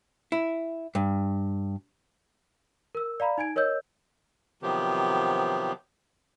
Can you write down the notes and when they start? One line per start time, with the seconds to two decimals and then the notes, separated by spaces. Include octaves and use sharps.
0.32 E4
0.95 G2
2.95 A#4 E6
3.20 D5 F5 A#5 B5
3.38 D#4 G#5 G#6 D7
3.56 A#4 C#5 D#5 E6 G6
4.62 C3 D#3 F3 F#3 B3 G4